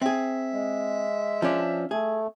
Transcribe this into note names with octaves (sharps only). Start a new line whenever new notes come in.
C4 G#4 E5
G#3
F3 C#4 D4
A3 G#4